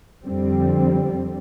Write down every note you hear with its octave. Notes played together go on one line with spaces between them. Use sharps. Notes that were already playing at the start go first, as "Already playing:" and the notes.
F2 D3 G3 C4